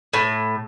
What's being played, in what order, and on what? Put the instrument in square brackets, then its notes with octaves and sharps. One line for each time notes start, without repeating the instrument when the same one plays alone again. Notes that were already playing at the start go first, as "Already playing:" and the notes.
[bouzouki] A2